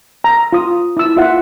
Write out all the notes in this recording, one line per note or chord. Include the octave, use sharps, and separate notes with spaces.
A#5
F4 D#6
E4 E6
F4 E5 F#5